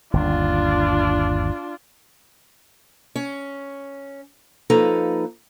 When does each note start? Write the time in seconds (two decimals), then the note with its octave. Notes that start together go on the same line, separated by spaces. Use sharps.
0.13 G1 D#2 D4 F4
3.16 C#4
4.70 F3 A#3 D#4 A4 B4 A#5